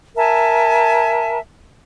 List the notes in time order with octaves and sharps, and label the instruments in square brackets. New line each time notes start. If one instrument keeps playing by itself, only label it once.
[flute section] A#4 E5 G#5 A5